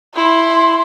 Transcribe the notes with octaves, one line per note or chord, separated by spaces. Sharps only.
E4 C6